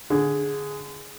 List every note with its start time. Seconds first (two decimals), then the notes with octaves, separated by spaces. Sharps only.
0.10 D3 G#4